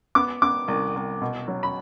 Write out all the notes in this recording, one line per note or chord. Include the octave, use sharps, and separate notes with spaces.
B3 D6
B3 D6
C2
C2
B2
F#3
B5